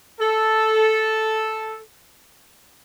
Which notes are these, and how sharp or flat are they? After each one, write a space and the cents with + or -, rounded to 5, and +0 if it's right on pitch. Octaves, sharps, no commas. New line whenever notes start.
A4 -5